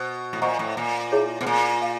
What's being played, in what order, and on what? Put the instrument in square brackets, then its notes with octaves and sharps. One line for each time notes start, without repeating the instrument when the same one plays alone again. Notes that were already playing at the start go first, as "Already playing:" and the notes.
Already playing: [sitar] B2 [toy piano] C5
[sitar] A2
[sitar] A#2 [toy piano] C5 D#5 F#5 A#5 C#6
[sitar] A2
A#2
[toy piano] E4 G#4 C#5 E5
[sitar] B2
A#2
[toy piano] F5